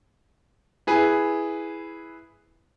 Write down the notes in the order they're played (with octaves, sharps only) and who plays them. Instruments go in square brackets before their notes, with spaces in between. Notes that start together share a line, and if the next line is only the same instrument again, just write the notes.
[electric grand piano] E4 G#4 B4